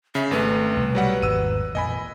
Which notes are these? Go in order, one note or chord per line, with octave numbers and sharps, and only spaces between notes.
C#3 E5
G#1 A3 B4
C2 B2
F#3 G3 F#5
G#1 E2 E6 D#7
F2 A#2 D#5 G#5 B5